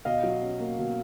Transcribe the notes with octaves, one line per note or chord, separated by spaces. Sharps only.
B2 D#5 F5
F#3
C#4
A#3
B2